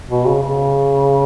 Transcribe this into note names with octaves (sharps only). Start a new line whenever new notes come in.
B2
C#3
C#3